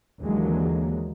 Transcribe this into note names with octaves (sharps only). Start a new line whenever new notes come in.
D#2 D3 E3 F#3 G#3 A#3